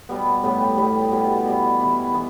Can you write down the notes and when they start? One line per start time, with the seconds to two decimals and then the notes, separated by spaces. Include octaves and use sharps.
0.09 B2 G3 B3
0.43 A2 G3 B3 G4
0.77 A2 G3 B3 G4
1.11 B2 G3 E4
1.46 B2 G3 E4
1.80 E3 B3 E4
2.14 E3 B3 E4